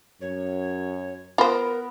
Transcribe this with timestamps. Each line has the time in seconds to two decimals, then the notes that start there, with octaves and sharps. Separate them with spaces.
0.21 F#2 C#5
1.38 B3 F4 A#4 C5